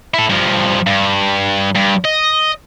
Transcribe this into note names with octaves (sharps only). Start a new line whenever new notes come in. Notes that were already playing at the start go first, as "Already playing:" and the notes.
E4 A4
G2 F3
G2
G2
D#5